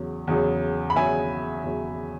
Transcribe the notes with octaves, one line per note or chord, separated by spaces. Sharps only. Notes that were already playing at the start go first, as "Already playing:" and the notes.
Already playing: E2 C#3 F#3 C#4
E2 C#3 F#3 C#4
B5
E2 C#3 F#3 C#4 E5 G#5
E2 C#3 F#3 C#4